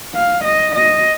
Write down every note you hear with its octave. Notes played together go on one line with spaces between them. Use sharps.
F5
D#5
D#5